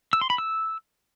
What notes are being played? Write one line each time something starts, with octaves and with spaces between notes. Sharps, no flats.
E6
C6
B5
E6